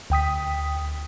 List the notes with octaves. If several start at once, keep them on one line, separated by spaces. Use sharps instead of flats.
D2 G5 D#6 B6